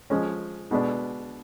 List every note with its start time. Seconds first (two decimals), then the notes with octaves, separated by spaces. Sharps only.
0.10 F3 G#3 C#4
0.71 B2 G#3 B3 D4